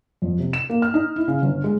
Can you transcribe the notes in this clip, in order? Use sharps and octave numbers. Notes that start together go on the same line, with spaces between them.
F2
C3
E7
A#3
F6
D#4
E4
C#3
G1
G#3